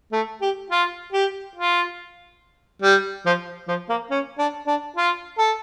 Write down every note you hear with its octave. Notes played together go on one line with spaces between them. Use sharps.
A3
G4
F4
G4
F4
G3
F3
F3
A#3
C#4
D4
D4
F4
A4